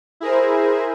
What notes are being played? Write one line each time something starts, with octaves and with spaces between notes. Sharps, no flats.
E4 G#4 A#4 C5